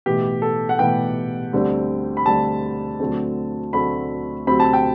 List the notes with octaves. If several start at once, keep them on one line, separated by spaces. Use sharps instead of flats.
B1 A2 E3 B3 G4
A4
F#5
B1 A2 E3 B3 G5
D2 D3 G3 C4
B5
D2 D3 G3 C4 A5
D2 D3 F#3 A3 C4
D2 D3 F#3 A3 C4 B5
D2 C3 F#3 C4 B5
A5
G5